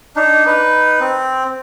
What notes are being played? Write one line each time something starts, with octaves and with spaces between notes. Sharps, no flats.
D4 D#4
D#4 B4
C4